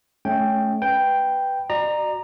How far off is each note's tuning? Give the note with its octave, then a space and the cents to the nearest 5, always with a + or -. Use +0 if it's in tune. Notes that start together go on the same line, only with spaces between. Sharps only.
A3 -25 C#4 +0 G5 +0
B4 +0 G5 +0
F#4 +0 D5 +40 A#5 +0